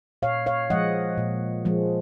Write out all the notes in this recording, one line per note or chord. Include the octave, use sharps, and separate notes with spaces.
A#2 C#5 F5
C#5 F5
F3 G#3 D#5 F#5
A#2
F3 G#3